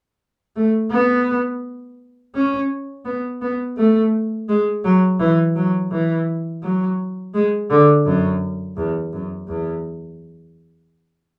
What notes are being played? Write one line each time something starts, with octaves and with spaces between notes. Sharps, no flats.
A3
B3
C#4
B3
B3
A3
G#3
F#3
E3
F#3
E3
F#3
G#3
D3
F#2
E2
F#2
E2